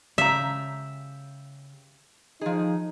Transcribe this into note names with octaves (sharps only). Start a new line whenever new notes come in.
C#3 G4 E5 A#5
F3 D#4 G#4